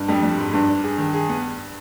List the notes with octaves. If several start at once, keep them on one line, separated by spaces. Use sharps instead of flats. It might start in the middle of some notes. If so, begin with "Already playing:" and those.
Already playing: G2
F2 G3
G3
G#2
G2 D4
D4
G#4
D#3
G#4
B3